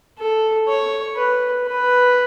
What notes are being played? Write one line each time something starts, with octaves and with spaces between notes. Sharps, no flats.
A4
C#5
B4
B4